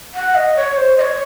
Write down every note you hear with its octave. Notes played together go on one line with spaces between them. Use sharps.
F#5
D#5
C#5
C5
D#5
C#5